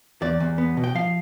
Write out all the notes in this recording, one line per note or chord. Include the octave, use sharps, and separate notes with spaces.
E2 D5
E2
B3
B2
G5
F3 F5